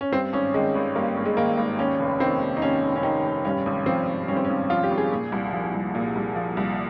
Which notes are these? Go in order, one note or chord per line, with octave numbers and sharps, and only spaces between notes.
C#4
G2 C4
G#1 C#4
D#3 G#3
G#1
G2 A#3
G#1
G#3
D#3 A#3
G#1
D#2 C#4
F1
D#3 C4
F1
D#4
D#2 C#4
F1
C#4
D#3 D#4
F1
G2 C#4
G#1
F3 C4
G#1
G2 C#4
C4
C#4
G#1
F3 F4
G4
G#1
G#4
A#2
C2
F3
C2
A#2
C2
F3
C2